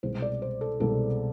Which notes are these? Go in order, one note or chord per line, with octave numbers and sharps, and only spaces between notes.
C2 B2 G#3 C5
D5
C5
A4
C2 B2 G#3 A4